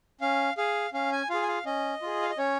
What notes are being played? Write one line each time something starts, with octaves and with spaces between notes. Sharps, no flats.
C#4 F5
G#4 F5
C#4 F5
G#5
F4 G#4 F5
G#5
F5
C#4 D#5
F4 G#4
F5
D#5
C#4 C#5